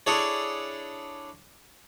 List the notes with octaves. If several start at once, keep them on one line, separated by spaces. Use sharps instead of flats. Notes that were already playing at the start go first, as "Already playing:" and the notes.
D4 E4 G#4 A4 C#5